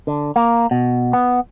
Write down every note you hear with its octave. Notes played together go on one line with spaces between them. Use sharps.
D3
A#3
B2
B3